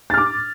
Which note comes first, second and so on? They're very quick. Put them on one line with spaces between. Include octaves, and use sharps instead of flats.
A6 F6 D6